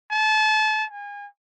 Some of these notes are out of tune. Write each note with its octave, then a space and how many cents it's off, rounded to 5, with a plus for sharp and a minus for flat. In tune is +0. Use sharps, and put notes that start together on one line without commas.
A5 -30
G#5 -35